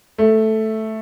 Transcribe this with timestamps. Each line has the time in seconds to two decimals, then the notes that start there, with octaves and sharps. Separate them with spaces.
0.18 A3